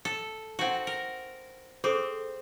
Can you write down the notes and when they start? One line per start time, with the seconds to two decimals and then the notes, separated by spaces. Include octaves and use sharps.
0.05 A4
0.59 C4 D#4 F#4 F#5
0.87 A#4
1.84 C4 G#4 A4 C5